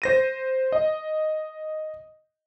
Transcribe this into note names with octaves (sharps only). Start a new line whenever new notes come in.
C5 A#6 D#7
D#5